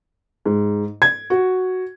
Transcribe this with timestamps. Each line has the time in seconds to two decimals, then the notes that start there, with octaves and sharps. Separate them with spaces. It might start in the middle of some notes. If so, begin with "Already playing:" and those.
0.46 G#2
1.02 G#6
1.30 F#4